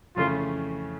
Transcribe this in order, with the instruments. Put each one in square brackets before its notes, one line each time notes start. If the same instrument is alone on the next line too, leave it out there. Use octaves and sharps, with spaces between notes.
[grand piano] F2 C#3 E3 A3 C#4 [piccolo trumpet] F4